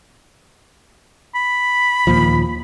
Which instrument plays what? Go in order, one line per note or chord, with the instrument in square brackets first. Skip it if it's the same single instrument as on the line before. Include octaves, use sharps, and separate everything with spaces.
[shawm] B5
[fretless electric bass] D#2 A#2 F3